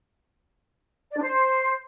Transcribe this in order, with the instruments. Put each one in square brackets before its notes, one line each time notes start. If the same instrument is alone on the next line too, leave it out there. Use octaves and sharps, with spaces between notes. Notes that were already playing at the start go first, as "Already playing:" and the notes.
[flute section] D5
D4
C5